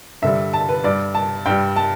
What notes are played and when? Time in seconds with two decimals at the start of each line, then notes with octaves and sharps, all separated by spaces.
0.22 G2 D3 G3 E5
0.53 A5
0.69 B4
0.84 G2 G3 D5
1.15 A5
1.46 G2 G3 G5
1.76 A5